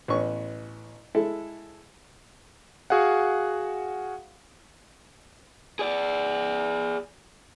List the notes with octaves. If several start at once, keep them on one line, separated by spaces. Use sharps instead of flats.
A1 B3 C#4 C#6
G#3 E4 A4
F#4 G#4 F5 F#5
G#4 D5